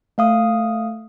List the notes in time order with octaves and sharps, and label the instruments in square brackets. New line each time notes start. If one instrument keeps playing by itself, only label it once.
[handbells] A3 F5 D#6